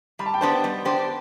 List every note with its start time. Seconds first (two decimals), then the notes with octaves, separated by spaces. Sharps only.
0.19 G3 B5
0.26 A5
0.34 G5
0.41 B3 D4 G4 C5 A5
0.64 G3
0.85 B3 D4 G4 C5